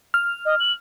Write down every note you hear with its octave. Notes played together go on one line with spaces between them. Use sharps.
F6
D#5
F#7